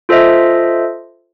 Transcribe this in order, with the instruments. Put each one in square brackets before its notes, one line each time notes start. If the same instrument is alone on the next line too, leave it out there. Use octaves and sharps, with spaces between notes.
[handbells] F4 A4 C5 D#5 E5